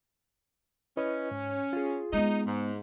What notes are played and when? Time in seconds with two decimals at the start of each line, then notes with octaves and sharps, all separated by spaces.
0.97 C#4 E4 B4 D#5
1.31 G#2
1.73 F4 G#4
2.13 G#3 B3 D#4
2.46 G#2